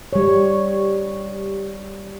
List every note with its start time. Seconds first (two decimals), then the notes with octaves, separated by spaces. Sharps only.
0.13 G3 C#5